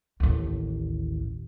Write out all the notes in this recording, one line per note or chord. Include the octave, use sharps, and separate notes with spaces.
A1 D#2